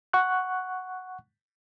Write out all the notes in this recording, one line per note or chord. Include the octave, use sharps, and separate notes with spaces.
F#5 C#6 F#6